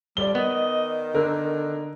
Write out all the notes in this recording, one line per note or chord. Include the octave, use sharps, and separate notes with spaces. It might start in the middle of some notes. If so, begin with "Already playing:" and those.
F2 G3 D5 G7
D#3 B3 D#5
D3 A#4